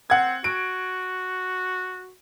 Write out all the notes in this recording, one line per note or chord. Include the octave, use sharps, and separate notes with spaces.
C4 F#5 G#6
F#4 D7